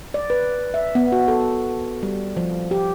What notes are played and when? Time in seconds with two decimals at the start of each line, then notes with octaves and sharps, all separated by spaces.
0.14 D5
0.30 B4
0.74 E5
0.95 B3
1.12 F#4
1.28 A4
2.03 G3
2.37 F3
2.71 G4